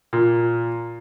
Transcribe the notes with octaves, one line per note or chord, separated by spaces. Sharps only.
A#2